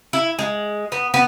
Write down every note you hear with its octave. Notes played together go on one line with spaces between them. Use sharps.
E4
G#3
B3
B3